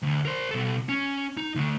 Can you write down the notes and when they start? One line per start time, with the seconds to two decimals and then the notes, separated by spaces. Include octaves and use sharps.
0.03 D2
0.25 A#4 C5
0.51 B2 A4
0.89 C#4
1.37 D#4
1.55 D2 A3